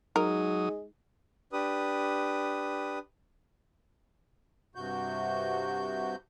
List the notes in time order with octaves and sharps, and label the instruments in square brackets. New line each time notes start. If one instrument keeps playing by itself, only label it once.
[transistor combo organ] F#3 D#6 [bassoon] G#3 [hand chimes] D#4 [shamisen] A#4
[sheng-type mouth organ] D4 G4 B4 D#6
[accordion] G2 C3 F#4 G6